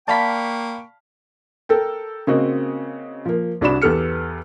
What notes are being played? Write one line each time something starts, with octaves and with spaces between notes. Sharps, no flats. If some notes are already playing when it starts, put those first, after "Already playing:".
A#3 D5 F5 G5 A5 B5 C#6 B6
A4 A#4 G5
C#3 A#3 C4 F#4 D#5
F3 A#3
C2 D4 F#4 D5 B5 E7
E2 B3 G4 A4 F6 C#7